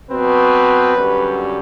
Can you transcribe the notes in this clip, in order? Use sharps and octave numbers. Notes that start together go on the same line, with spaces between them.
B2 F#3 C4 B4
F#2 D3 G3